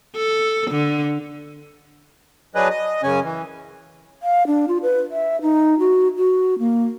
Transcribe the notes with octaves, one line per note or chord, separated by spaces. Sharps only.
A4
D3
F#3 D4 G#4 B4 D#5
D#5
F#2 C#3 C#4 G#5
E3
F5
D4
F4
B4
E5
D#4
F#4
F#4
A#3